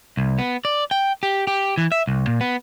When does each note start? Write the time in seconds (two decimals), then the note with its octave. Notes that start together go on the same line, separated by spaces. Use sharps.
0.17 C2
0.39 B3
0.65 D5
0.91 G5
1.23 G4
1.47 G4
1.78 E3
1.92 E5
2.07 C2
2.27 A#2
2.41 B3